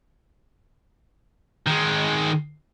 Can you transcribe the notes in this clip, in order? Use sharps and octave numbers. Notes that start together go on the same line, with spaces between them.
D#3 G#3